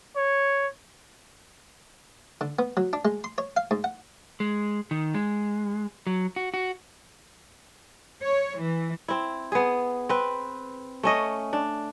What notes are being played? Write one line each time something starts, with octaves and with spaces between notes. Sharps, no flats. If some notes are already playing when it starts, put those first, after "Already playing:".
C#5
D3
B3
F#3
D4
G#3
C6
C#5
F5
G#2
F#5
G#3
D#3
G#3
F#3
F#4
F#4
C#5
E3
C4 E4
B3 G#4
C4 B4
A3 C#4 D#5
D4